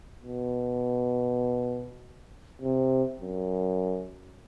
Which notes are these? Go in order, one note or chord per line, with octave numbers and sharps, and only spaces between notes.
B2
C3
F#2